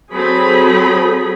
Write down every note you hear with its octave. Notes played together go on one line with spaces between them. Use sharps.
F#3 C4 G#4 A4 B5